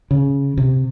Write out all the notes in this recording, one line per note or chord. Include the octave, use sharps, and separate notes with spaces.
C#3
C3